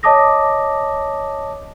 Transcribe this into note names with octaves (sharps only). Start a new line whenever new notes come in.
C#5 D#5 A5 D6 D#6 A#6